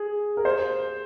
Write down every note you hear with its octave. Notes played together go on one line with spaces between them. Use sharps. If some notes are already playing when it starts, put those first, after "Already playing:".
Already playing: G#4
A#4
C5